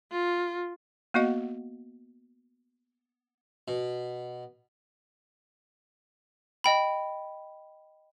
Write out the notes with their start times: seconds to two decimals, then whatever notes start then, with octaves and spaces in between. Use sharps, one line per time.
0.12 F4
1.14 A#3 B3 F#4 D#5 F#5
3.68 B2
6.64 D#5 G5 B5